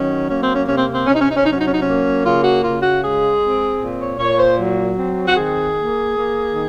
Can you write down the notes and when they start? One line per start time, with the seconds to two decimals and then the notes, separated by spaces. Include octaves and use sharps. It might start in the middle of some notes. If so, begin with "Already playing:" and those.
Already playing: D#3 F#3 C#4
0.29 A#3 C#4
0.42 C4
0.55 C#4
0.68 C3 C#4
0.76 C4
0.93 C4
1.07 C3 C#4
1.14 D#4
1.21 C#4
1.29 D#4
1.37 C#4
1.44 F#3 D#4
1.51 C#4
1.59 D#4
1.66 C#4
1.73 D#4
1.80 C#4
1.85 A#3
2.24 C#3 F4
2.43 F#4
2.63 C#3 F4
2.82 F#4
3.02 G#3 G#4
3.41 C4
3.80 A#2
3.99 C#5
4.19 A#2 C#5
4.39 C5
4.58 F#3
4.97 C4
5.26 F#4
5.36 D#3 G#4
5.75 A#3
6.14 A#3
6.53 D#3